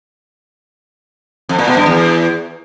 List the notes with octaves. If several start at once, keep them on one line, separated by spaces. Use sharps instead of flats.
F2
A#2
B2
G2
E2